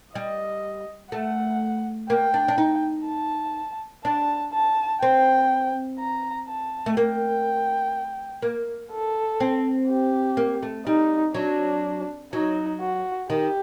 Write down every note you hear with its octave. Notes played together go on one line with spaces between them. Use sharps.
G3 D#5
A3 F#5
A#3 G5
D4
D4
D#4
A5
D4 A5
A5
C4 G5
A#5
A5
A3
A#3 G5
A#3
A4
C4
G4
A#3
A3
G3 D#4
F#3 D4
F#3 D#4
F#4
D#3 G4